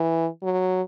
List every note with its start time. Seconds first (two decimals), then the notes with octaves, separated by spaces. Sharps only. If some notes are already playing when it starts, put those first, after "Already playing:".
Already playing: E3
0.43 F#3